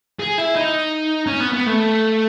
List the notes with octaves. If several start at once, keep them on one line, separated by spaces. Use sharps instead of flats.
G#4
E4
D#4
C#4
B3
B3
A3